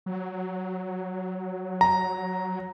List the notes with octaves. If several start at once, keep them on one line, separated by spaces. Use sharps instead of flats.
F#3
A#5